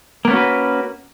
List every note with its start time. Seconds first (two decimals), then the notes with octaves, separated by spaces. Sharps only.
0.25 A#3
0.28 B3
0.31 C#4
0.34 F#4
0.36 B4